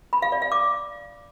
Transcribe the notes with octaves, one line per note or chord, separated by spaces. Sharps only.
B5
F5
D5
F5
D6